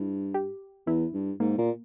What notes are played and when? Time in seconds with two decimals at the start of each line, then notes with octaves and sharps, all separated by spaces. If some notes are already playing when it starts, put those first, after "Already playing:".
Already playing: G2 E4
0.34 G4
0.87 E2 E4
1.14 G2
1.40 G#2 A#3
1.58 A#2